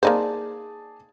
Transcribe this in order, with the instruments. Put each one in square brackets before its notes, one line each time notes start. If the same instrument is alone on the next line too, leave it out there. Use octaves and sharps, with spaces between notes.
[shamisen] A#3 D#4 C5 [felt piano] G#4 D5 A5